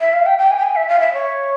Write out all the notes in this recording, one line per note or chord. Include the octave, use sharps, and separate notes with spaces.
E5
F5
G5
G5
G#5
G5
G#5
E5
F5
E5
C#5